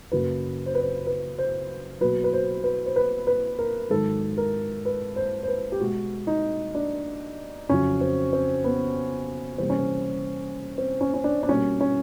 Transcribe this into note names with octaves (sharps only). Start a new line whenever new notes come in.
F#2 C#3 F#3 A#3 B4
C5
B4
C5
B4
C5
B2 F#3 A#3 B4
B4
C5
B4
C5
B4
B4
A#4
G#2 D#3 F#3 A4
A#4
B4
C5
C5
B4
G4
B2 G#3 F#4
D#4
D4
F2 C#3 F#3 C#4
C4
C4
B3
C3 E3 G3 A#3 C4
C#4
C4
C4
C#4
C#4
D4
D4
B2 G3 A#3 C#4
C#4